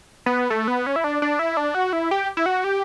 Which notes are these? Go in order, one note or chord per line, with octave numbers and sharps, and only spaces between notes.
B3
A3
B3
C#4
E4
D4
D4
E4
D4
F#4
E4
G4
E4
F#4
G4